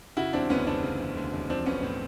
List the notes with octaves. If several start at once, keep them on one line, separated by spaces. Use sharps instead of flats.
C#3 E4 F#4
E1 C4 D4
D2 B3 C#4
E1 C4 D4
C#3
E1
D2
E1
F3 C4 D4
B1 B3 C#4
A2 C4